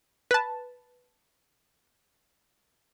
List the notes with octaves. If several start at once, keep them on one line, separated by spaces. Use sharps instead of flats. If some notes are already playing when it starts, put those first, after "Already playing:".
B4 A5